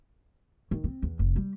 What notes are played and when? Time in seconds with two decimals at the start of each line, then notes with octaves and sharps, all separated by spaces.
0.71 D#3
0.84 C4
1.02 E2
1.19 F1
1.36 G3